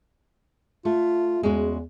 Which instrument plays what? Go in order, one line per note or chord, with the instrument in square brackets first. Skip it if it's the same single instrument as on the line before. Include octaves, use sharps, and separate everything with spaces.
[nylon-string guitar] A3 [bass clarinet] F4
[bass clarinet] E2 [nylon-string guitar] G#3 C#4 F#4